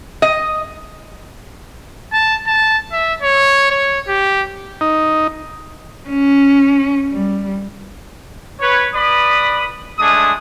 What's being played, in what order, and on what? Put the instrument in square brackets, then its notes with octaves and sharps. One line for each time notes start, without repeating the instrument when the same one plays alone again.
[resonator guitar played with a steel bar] D#5
[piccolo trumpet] A5
A5
E5
C#5
C#5
G4
[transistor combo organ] D#4
[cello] C#4
G3
[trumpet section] B4 C#5
B4 D5 B5 D#6
G#3 A3 D4 G#5 D#6